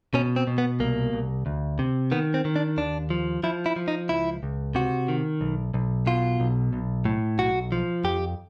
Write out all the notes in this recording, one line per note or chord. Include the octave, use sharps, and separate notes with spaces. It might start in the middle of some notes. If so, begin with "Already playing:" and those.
B2 C#4
C4
B2
B3
C2 A#3
C2
D2
C3
D#3 B3
C4
D#3
D4
D#2 D4
F3
F3 E4
E4
F3
D#4
C#2 E4
C#2
C3 F#4
D#3
B1
B1
B2 F4
B1
B1
A2
B1 F#4
F3
F2 G4